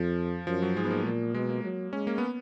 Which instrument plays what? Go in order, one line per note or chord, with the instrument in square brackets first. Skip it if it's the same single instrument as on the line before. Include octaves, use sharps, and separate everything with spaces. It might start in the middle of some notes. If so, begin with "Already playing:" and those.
Already playing: [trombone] F2 [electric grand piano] F3
[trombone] F#2 [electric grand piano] F3
[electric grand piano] F#3
[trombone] G#2 [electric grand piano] G#3
[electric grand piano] B3
A#3
[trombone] A#2
[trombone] B2 [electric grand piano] G#3
[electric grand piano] A#3
[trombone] F#3
[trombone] G#3 [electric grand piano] C#4
[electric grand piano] A#3
B3